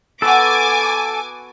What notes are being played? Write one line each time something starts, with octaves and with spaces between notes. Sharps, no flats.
B3 F#4 A4 G#5 B5 D6